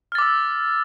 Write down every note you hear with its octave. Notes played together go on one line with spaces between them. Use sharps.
D6 E6 F6 A6